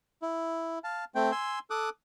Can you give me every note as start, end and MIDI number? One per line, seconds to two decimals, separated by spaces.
0.22 0.79 64
0.84 1.05 77
0.84 1.05 81
1.15 1.32 57
1.15 1.32 60
1.15 1.32 79
1.32 1.59 80
1.32 1.59 84
1.32 1.59 88
1.70 1.89 69
1.70 1.89 86
1.70 1.89 87
1.70 1.89 90